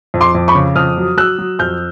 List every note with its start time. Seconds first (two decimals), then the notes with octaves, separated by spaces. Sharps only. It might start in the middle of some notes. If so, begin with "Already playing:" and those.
0.14 F2
0.21 C6 D6
0.35 F2
0.48 B5 C#6
0.55 C#3
0.76 F2 D#6 F6
0.97 F#3
1.17 F#3 E6 F#6
1.38 F#3
1.59 F2 F6 G6